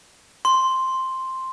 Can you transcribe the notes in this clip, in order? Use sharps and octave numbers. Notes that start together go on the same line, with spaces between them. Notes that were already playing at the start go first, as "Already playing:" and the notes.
C6